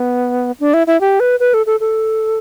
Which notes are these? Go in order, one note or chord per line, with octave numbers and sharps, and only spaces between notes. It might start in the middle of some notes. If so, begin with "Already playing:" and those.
Already playing: B3
D4
E4
E4
G4
B4
B4
A4
A4
A4